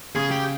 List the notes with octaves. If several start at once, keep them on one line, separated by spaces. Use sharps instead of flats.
C#3 G#4
G4